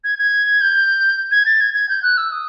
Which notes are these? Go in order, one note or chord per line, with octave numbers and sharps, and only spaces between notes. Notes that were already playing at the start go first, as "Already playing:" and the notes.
G#6
G#6
G6
G#6
A6
G#6
G#6
G6
F#6
E6
D#6